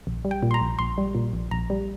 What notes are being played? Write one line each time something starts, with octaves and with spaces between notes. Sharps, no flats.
A#1
G3
G5
A#2
C6
A#5
A#1
A#1 C6
G3
A#2
A#1
A#1 A#5
G3